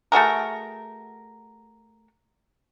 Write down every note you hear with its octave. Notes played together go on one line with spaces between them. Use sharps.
A3 F#4 G#4 A#4